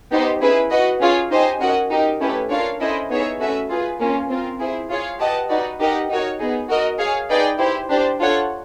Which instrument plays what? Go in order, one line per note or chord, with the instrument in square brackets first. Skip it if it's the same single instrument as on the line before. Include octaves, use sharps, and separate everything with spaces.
[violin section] B3 D#4 G4 C5
C#4 E4 G#4 B4
F#4 B4 D#5 F#5
C#4 F4 G#4 C#5 F5
D#4 G4 C5 D#5 G#5
C#4 F#4 A#4 D#5 F#5
D#4 G4 A#4
A3 C#4 E4 G4 B4
D4 F4 A#4 C#5 F5
C#4 E4 A4 C5 D#5
B3 D#4 G#4 C#5 E5
A3 C#4 F#4 B4 E5
F4 G#4 B4
A#3 C#4 F4
C4 F4 A#4
E4 G#4 C5
F4 G#4 C#5 F5
G4 B4 D#5 F#5 A5
D#4 F#4 B4 D5
D#4 G4 A#4 D#5 F#5
D#4 F#4 A#4 C#5
B3 D#4 G#4
F#4 A#4 D#5
G#4 C#5 F5
D#4 G#4 B4 D5 G5
E4 G4 C5
D4 G4 C5
D4 F4 A4 C#5 F#5